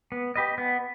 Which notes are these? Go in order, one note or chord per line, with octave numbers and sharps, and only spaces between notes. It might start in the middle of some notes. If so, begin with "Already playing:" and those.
B3
G4 B4 D#5
B3